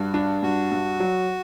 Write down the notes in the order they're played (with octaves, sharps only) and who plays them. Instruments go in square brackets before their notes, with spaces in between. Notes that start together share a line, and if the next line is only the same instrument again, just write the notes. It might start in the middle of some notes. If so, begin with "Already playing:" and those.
Already playing: [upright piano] G2 [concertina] F#4
[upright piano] D4
[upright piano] G2 [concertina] F#4
[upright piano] G2
F#3